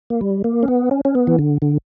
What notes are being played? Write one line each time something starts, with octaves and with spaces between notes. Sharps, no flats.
A#3
G3
A#3
C#4
B3
C#4
C#4
B3
E3
D3
D3